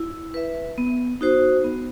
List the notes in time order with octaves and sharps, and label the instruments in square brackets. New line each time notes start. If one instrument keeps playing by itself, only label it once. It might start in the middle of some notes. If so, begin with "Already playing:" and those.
Already playing: [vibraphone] E4
B4 E5
B3
D#4 F#4 C5
B3